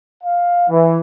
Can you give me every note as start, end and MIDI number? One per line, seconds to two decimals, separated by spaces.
0.24 0.67 77
0.69 0.99 52